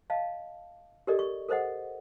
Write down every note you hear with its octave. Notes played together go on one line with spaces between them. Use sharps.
D#5 F5 A5
G4 A4 A#4 D5 D#5
C#6
A4 A#4 C5 D#5 F#5